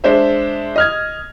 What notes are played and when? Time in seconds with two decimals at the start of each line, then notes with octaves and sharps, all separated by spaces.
0.04 G#3 D4 C5 E5
0.76 D#5 F6 G#6